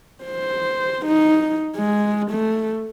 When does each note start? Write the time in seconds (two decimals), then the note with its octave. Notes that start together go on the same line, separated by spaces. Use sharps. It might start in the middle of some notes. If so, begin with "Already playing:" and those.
0.24 C5
1.06 D#4
1.77 G#3
2.31 A3